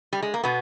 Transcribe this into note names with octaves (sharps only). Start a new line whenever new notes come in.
G3
G#3
A#3
B2 B3